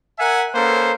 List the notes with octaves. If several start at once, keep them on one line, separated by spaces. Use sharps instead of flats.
A#4 E5 F#5 G#5
A#3 C#4 A4 B4 C5